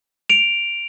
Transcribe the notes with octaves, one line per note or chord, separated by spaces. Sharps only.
D7 F7